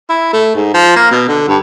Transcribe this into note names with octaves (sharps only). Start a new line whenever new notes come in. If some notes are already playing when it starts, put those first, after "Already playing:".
E4
A3
G#2
F3
A#3
B2
D3
G2